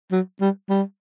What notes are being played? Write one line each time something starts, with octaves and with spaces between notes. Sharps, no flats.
F#3
G3
G3